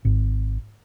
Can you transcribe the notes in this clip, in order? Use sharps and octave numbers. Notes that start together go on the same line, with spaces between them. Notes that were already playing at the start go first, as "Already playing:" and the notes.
G#1